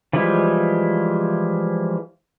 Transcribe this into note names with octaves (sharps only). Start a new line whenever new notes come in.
E3 F3 G3 G#3 E4